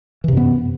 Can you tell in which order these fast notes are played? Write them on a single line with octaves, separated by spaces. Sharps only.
E3 C3 F#2 B3